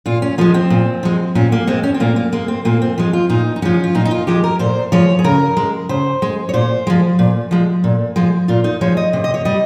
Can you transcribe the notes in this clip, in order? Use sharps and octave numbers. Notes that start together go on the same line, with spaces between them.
A#2 F4
C#4
F3 G#3 A#3
C4
A#2
F3 G#3
A#2 C#4
A#3
G#3 C4
C#4
C4
A#2 A#3
A#3
G#3 A#3
C4
A#2 A#3
C4
F3 G#3
F4
A#2 D#4
D#4
F3 G#3 C#4
F4
A#2 D#4
D#4
F4
F3 G#3 G4
A#4
A#2 C5
F3 G#3 C#5
G#4
C#3 A#4
G#3
C#3 C5
G#3
C#5
A#2 C5
F3 G#3
A#2
F3 G#3
A#2
F3 G#3
A#2 F4
D#4
F3 G#3 C#5
D#5
C3
D#5
C#5
G3 D#5